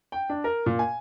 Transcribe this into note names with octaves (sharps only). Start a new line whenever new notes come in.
G5
D4
A#4
A#2
G#5